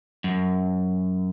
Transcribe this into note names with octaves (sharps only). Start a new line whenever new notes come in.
F#2